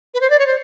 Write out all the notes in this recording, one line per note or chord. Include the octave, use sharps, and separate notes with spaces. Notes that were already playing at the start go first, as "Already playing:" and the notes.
B4
C5
D5
C#5
C5